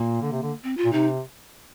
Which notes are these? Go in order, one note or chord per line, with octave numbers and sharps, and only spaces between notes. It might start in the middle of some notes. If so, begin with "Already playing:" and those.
Already playing: A#2 A#3
D3
C3
D3
C4
F4
A#2
C3 D#4